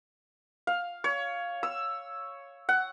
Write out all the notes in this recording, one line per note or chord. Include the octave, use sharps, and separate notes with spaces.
F5
C#5
E6
F#5